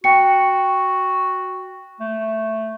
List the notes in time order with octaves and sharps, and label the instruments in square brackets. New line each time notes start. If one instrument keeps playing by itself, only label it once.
[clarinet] F#4 [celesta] G5 C#7
[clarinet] A3